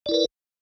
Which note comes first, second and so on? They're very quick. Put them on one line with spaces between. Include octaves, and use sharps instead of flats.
D5 E4 A#4 B4